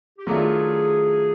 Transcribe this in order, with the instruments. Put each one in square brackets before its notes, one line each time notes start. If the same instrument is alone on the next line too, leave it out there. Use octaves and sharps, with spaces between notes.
[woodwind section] G4
[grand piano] D#3 F#3 A3 D4 F4 [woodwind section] G#4